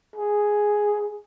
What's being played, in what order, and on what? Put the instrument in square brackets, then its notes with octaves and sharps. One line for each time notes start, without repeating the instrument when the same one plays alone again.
[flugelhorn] G#4